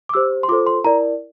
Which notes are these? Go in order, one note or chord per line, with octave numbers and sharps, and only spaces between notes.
D6
G4 C5 E6
C6
F4 A4 C5 D6
C6
E4 A#4 D5 A#5